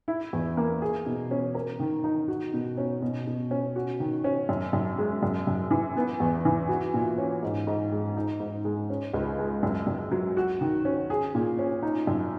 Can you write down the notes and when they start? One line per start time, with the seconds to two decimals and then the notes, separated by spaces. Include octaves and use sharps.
0.08 E4
0.33 E2
0.57 A#3
0.82 G#4
1.06 B2
1.31 C#4
1.55 A#4
1.80 D#3
2.04 D#4
2.28 F#4
2.53 B2
2.77 C#4
3.02 B2
3.27 B2
3.51 C#4
3.76 F#4
4.00 D#3
4.24 C#4
4.49 F#2
4.73 F#2
4.98 G#3
5.23 F#2
5.47 F#2
5.71 E3
5.96 B3
6.20 E2
6.45 E3
6.69 F#4
6.94 A#2
7.18 C#4
7.43 G#2
7.67 G#2
7.92 G#3
8.16 D#4
8.40 G#2
8.65 G#3
8.90 C#4
9.14 C#2
9.39 G#3
9.63 F#2
9.87 F#2
10.11 F#3
10.37 F#4
10.61 D#3
10.85 C#4
11.10 G#4
11.35 A#2
11.59 C#4
11.83 D#4
12.07 F#2